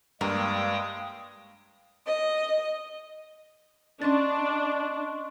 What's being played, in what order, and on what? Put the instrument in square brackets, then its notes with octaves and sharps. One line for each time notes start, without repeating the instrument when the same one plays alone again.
[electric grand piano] G2 [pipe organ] G#3 G5 D#6 [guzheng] A#3 [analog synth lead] F5
[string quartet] D#5
[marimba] C#4 A6 [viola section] D4 [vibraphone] D#5 C6 C#6